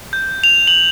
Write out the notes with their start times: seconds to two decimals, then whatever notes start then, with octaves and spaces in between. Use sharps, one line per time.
0.13 G6
0.44 F7
0.67 F#7